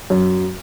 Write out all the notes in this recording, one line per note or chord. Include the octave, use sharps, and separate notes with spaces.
F#2